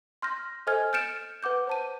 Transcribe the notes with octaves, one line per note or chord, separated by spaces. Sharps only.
C6 F6 G6 A#6
A4 C5 D#5 G#5 F6 G#6
F6 G6 A6 C#7 D7 E7
B4 F#5 D6 G6
C5 A5 D#7